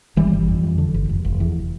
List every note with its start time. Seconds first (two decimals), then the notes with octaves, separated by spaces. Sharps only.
0.16 G1 E3 G3
0.33 G1
0.48 F2
0.63 F2
0.78 D3
0.94 G1
1.09 F1
1.25 F1
1.40 E2